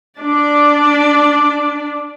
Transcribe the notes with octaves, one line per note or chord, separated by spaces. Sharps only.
D4 D5